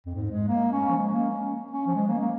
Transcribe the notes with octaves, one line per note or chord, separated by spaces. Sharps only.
F2
G#2
G#3
A#3
C#4
F3
G#3
A#3
C#4
C#4
F3
G#3
A#3
A#3